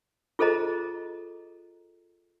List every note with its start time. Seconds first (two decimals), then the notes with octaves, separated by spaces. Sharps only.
0.39 F4 G#4 A4 C5 D#5 A#5